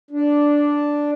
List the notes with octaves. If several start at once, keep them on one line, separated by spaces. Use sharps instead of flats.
D4